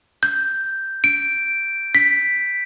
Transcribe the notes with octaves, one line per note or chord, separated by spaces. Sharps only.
G6
D7
B6